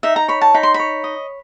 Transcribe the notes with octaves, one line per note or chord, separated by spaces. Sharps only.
D#4 E5
A#5
C#5 B5
A5
D#4 B5
C6
B5
C#5
D#5